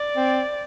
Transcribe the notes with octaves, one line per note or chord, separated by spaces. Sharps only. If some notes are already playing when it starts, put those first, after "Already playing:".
Already playing: D5
C4